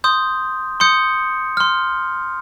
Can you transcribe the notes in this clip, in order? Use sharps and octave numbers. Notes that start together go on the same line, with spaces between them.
C6 D#6 G6
C6 D#6 G6 C#7
C6 F6